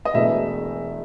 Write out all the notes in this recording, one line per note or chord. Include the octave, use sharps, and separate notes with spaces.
D#5
E1 E2 B2 A3 E5